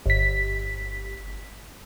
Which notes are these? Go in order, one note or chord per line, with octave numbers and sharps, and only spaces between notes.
G1 B6